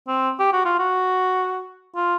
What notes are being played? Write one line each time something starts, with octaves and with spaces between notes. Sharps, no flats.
C4
G4
F#4
F4
F#4
F4